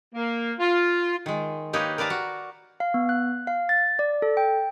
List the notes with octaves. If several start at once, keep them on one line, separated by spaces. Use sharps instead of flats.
A#3
F4
D#3 G#3
A#3 D#4 G4 B4 C#5 D#5
A#4 B4 D5 F5 A5 A#5
F#4
F5
B3
F#6
F5
A6
D5
A4
G5